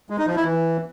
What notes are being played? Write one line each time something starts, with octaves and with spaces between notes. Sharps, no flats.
G#3
D#4
F3
E4
E3